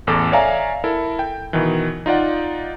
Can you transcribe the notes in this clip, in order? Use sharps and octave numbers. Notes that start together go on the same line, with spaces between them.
A1 E2 A4 D6
C#5 D5 E5 F5 G#5 A#5
E4 A4 A#4
G5
B2 D#3 E3
D#4 F4 D5 F#5